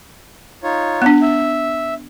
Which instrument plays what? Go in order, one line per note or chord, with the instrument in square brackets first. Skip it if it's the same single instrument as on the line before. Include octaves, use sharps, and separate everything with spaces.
[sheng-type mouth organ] D#4 F4 C#5
[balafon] B3 D4
[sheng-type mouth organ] E5